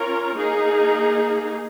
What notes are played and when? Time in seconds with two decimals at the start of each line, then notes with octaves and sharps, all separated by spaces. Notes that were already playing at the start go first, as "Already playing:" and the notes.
Already playing: C#4 F4 A#4 C#5
0.34 A#3 D#4 G#4